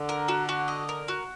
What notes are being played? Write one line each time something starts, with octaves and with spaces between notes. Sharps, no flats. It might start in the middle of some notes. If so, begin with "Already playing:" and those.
Already playing: D3
A#4
F#4
F#4
D#5
A#4
F#4